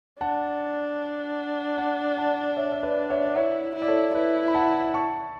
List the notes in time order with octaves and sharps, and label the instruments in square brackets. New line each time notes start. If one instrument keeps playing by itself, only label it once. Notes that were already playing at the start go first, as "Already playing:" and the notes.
[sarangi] D4 [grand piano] F#5 A5
[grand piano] F#5 A5
F#5 A5
C#5 E5
E5
B4 D5
C#5 E5
D5
[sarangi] E4 [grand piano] C#5 E5
[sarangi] E4
[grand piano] D5
A4 C#5
[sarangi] E4 [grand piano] B4
[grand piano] B5
F#5 A5
A5 C#6